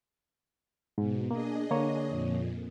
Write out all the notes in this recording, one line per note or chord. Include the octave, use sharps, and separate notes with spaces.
G#2 B2
A#3 D4 G#4 D#5
D3 A#3 C#5
F2 A#2